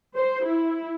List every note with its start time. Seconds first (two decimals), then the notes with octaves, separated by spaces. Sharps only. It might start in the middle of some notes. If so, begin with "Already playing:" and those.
0.16 C5
0.45 E4